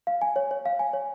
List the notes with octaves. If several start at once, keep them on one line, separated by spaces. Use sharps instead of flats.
F5
G#5
C#5
C#5
F5
G#5
C#5